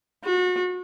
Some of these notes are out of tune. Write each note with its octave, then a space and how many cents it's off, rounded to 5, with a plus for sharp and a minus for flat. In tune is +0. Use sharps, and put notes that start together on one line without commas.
F#4 -35